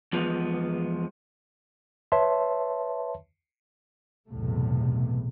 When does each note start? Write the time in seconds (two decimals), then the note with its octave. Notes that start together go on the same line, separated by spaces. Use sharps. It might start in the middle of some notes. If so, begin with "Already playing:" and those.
0.13 E2 F3 G#3 B3
2.12 B4 C#5 E5 A5 C6
4.29 B1 E2 A2 C3 A3